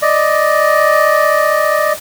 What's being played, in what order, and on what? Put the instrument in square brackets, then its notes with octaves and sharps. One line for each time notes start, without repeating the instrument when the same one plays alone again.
[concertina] D5 D#5